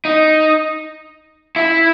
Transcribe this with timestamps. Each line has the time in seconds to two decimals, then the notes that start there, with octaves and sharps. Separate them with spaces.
0.05 D#4
1.56 E4